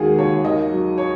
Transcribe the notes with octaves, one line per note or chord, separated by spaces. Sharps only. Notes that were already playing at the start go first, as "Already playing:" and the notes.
Already playing: D#2 D#3 G#3 F#4 G#4
D#2 C#5
D#3 D#5
F#3
C#5